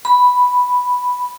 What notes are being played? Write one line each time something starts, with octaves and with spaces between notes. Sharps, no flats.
B5